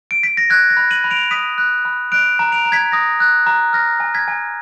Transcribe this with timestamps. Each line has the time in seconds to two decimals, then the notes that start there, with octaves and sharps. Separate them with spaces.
0.11 D7
0.23 B6
0.37 A#6
0.50 F#6 G#6
0.70 A#6
0.77 B5
0.91 D#7 F#7
1.04 B5
1.11 D7 F7
1.31 D#6 B6 D#7
1.58 F#6
1.85 B5
2.12 F#6 D7 F7
2.39 A#5
2.52 D7 F7
2.65 A#5
2.72 G#6 B6
2.92 D#6 A#6
3.20 F#6
3.47 A#5
3.73 F6 A#6
4.00 G#5
4.14 G#6 B6
4.28 G#5